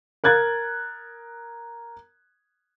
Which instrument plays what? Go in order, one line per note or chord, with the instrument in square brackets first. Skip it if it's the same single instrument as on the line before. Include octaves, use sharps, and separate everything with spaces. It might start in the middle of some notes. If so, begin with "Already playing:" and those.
[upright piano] A#4 F#6 G#6 A6